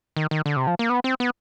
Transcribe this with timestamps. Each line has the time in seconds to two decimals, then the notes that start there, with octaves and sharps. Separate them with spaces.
0.16 D#3
0.31 D#3
0.46 D3
0.56 C3
0.67 F3
0.79 A#3
0.90 B3
1.04 C4
1.20 B3